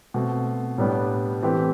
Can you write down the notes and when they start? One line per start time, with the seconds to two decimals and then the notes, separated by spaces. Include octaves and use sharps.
0.14 B2 A3 C4
0.78 A2 G3 B3 D4
1.42 E3 A3 C4 G4 B4